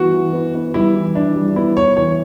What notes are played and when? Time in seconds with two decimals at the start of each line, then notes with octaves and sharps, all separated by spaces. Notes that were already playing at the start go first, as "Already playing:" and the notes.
Already playing: E3 G3 B3 F#4
0.13 E3
0.33 B3
0.55 B3
0.74 G3 E4
0.95 E3
1.15 D4 E4
1.36 G3
1.56 B3 E4
1.76 B3 C#5
1.96 E3 C#5